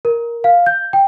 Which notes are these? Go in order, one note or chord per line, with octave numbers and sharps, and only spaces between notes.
A#4
F5
G6
G5